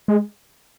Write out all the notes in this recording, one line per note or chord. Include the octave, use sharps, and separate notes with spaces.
G#3